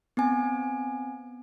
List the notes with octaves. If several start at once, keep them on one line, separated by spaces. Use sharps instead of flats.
B3 C4 G#5